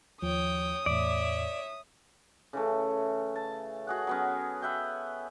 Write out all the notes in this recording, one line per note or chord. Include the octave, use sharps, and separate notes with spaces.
D#2 F3 C#5 G5 D#6
E2 A2 C#5 D5 E5
C#3 E3 A3
A5
F#4 G#4 F#5
F#3 B3 C#4
B4 E5 F#5 G5